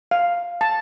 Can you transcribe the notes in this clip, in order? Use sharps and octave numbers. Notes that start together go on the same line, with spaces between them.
F5
A5